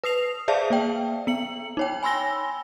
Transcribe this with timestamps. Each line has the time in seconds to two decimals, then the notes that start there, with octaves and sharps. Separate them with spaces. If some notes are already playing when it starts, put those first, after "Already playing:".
0.04 B4 D#6 C7 F7
0.48 G#4 C5 D5 E5 F5 A5
0.70 A#3 D5 G5
1.27 B3 C#7 F#7
1.77 D#4 C#5 G5
2.03 G#5 B5 C6 E6 A#6 G7